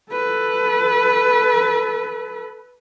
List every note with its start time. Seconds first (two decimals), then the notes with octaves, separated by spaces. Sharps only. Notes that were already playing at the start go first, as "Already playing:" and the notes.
0.12 A4 B4